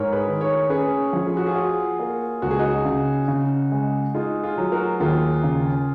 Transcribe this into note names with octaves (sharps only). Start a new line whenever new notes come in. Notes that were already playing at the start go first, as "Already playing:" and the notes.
Already playing: G#2 A#4 C#5
G#4 B4
D#3
A#4 C#5
C#4 G#4 B4
F3
G#4
F#4
F4 G#4
F#4
A#3
C#2 F#4
G#4
D#4 F#4
C#3
C#3
G#3
D#4 F4 G#4
F4 G#4
F#3
F#4 A#4
D#2 F4 G#4
C#3